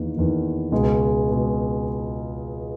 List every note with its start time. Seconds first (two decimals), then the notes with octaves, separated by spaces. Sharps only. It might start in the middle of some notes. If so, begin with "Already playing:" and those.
Already playing: E2 D#3 A#3
0.15 E2 D#3 A#3
0.72 C#2 B2 G#3
1.31 B2 G#3